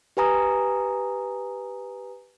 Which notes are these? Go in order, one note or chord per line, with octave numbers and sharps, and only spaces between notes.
G4 B4 G#5 A#5 D#6